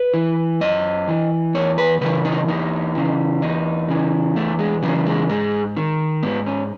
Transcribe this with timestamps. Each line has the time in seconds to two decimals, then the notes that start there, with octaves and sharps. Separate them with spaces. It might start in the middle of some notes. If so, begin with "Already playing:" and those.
Already playing: B4
0.14 E3
0.61 F#2 D#5
1.08 E3
1.54 E2 C#5
1.78 B4
2.01 C#3 E3 B4
2.25 D#4
2.48 E2 D#4
2.95 C#3 E3
3.42 E2 D#4
3.89 C#3 E3
4.36 E2 A3
4.59 G#3
4.83 C#3 E3 F#3
5.06 G#3
5.29 G#2 G#3
5.77 D#3
6.23 G#2 B3
6.46 C#4